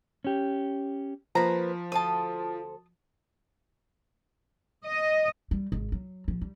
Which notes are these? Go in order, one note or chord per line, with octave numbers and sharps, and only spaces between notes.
C#4 G4
F3 A#3 B4 C5 A#5 B5
D2 A4 C5 A5 D#6
D#5
G3
G#1
F#3
A#1 F3
G3